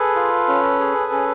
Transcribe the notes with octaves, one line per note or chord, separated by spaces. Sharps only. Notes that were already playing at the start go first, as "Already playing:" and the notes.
Already playing: G#4 A4 B4
F4
C#4
G#4
C#4